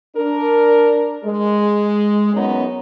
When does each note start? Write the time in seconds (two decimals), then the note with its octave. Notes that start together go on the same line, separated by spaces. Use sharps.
0.16 D4 A#4
1.24 G#3
2.34 F#2 B3 C#4 D#4